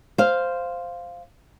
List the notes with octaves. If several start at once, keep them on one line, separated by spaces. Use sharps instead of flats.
C5 F5